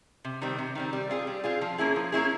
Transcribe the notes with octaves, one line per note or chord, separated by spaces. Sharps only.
C3
D#3 G3 C4
C3
D#3 G3 C4
G3
C4 F4 G#4
G3
C4 F4 G#4
F3
A#3 C#4 E4 G#4
F3
A#3 C#4 E4 G#4